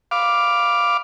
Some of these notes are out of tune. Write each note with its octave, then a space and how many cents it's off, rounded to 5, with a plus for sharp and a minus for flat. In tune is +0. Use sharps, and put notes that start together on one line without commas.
F5 +0 B5 +0 D6 +0